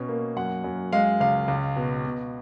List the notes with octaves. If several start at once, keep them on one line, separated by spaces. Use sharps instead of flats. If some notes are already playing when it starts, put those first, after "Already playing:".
Already playing: B2 C#4
A#3
F#2 F#5
F#2
G#3 F5
C#2 F5
C#2
B2
B2